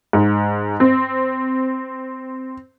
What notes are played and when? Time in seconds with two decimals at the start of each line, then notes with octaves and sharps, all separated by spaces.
0.13 G#2
0.80 C4